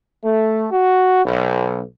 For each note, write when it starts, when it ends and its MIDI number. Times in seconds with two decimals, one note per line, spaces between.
0.25 0.67 57
0.72 1.23 66
1.25 1.81 35